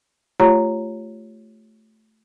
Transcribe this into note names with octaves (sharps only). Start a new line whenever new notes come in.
A3 F4 G4 C#5 A#5